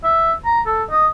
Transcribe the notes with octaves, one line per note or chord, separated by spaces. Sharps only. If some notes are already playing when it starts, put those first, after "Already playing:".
E5
A#5
A4
D#5